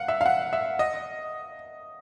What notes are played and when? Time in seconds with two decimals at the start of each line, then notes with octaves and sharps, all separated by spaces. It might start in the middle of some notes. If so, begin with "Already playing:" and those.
Already playing: F5 F#5
0.08 E5
0.21 F5
0.26 F#5
0.53 E5
0.79 D#5